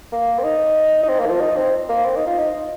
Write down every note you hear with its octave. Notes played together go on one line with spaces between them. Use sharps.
A#3
C4
D#4
D#4
C4
A#3
D#3
F3
D#4
C4
A#3
C4
D#4
F4
D#4